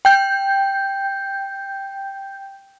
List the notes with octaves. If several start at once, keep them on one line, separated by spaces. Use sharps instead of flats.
G5 G6